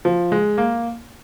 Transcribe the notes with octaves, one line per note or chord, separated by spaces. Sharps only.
F3
G#3
A#3